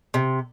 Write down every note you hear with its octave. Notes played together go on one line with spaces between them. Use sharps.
C3